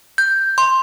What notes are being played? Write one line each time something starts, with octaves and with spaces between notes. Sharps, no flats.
G6
C6